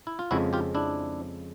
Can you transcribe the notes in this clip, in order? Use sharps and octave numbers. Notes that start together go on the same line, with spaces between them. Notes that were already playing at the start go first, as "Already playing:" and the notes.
E4
F4
F2 C#3 F3 G#3 E4 F#4
F4 G4
D4 E4